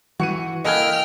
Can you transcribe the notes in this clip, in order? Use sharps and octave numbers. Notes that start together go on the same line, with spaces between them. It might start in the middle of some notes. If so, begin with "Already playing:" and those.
E3 F#4 C#7 D#7
E3 A#3 A4 D#5 G5 G#5 F6 G#6